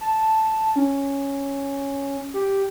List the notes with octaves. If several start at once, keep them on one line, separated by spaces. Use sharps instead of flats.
A5
C#4
G4